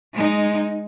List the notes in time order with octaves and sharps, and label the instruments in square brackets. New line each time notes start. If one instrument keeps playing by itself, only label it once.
[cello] G#3 D#4